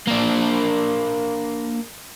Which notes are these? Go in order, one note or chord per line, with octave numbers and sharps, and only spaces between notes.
A#3 D4